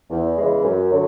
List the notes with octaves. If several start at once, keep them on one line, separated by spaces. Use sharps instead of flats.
E2
C#3 E3 G#3
F#2
D3 F#3